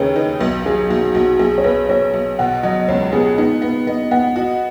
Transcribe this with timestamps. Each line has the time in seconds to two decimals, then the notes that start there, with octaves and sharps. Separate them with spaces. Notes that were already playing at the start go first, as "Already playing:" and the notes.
Already playing: D#2 C#3 D#4 G#4 B4 C#5 D#5
0.16 D#4 B4
0.40 B1 B4
0.66 F#3 G#4
0.90 B1 F#4
1.15 B1 F#4
1.39 B1 G#4
1.58 C#5
1.64 B1 B4
1.89 B1 C#5
2.13 B1
2.39 B2 F#5
2.63 F#3 D#5
2.88 C#2 C#5
3.12 B3 G#4
3.38 B3 D#4
3.62 B3 B4
3.87 B3 D#5
4.11 B3 F#5
4.36 F#4 D#5